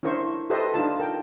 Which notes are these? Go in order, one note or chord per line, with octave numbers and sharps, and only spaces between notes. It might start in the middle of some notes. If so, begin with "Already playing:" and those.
C#4 D4 E4 A#4 C5 C#6
G4 A4 B4 C5 D#5 E5
D4 D#4 F4 A5
A#4 G5